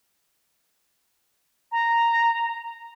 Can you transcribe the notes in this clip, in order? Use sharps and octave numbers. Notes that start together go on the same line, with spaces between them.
A#5